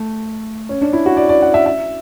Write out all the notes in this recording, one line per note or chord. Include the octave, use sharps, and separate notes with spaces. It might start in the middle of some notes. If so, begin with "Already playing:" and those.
Already playing: A3
C#4
D4
E4
F#4
D5
D5
F#5
E5
E5